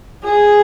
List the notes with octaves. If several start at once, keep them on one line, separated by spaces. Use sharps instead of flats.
G#4